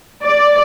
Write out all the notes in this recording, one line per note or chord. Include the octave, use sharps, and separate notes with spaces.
D5